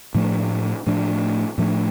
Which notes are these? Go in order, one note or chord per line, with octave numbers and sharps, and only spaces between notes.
A2 F3 A3 D4
A2 F3 A3 D4
A2 F3 A3 D4